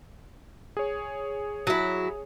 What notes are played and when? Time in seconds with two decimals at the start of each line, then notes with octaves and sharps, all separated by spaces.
0.77 G#4 C#5
1.67 F#3 E4